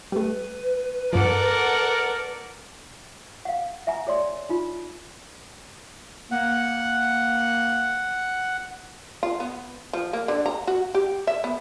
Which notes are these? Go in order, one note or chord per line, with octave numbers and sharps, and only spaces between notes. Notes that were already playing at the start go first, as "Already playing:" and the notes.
G3 A3 B4
G2 F3 A4 A#4 D5 F#5
F5 F#5
E5 F#5 G#5 A#5
G#4 C#5 D5 C6
D#4 F4
A#3 F#5
F4
B3
F3
A#3
D3
A#5
F#4
G4
E5
B3